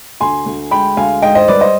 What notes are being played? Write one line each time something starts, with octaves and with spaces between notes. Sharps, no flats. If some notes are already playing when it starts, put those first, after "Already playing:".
D2 G#5 C6
D2
G#3 G5 B5
D2 F5 G#5
G#2 D#5 G5
C5 D#5
G3 B4 D5
C5 D#5